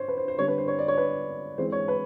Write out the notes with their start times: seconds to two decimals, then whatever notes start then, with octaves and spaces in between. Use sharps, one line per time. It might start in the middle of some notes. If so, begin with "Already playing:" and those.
Already playing: C5 C#5
0.08 B4
0.17 C5
0.28 C5
0.38 D3 G3 C4 C#5
0.48 B4
0.58 C5
0.68 C#5
0.79 D5
0.88 C#5
0.97 B4
1.58 E3 G#3 C4 C5
1.72 C#5
1.88 B4